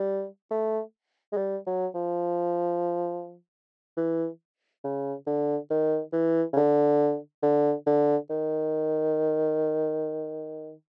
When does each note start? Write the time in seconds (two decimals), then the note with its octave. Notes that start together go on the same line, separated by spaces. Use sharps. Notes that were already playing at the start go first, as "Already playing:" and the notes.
Already playing: G3
0.51 A3
1.33 G#3
1.37 G3
1.67 F#3
1.95 F3
3.97 E3
4.84 C#3
5.27 D3
5.70 D#3
6.13 E3
6.53 C#3
6.56 D3
7.43 D3
7.87 D3
8.30 D#3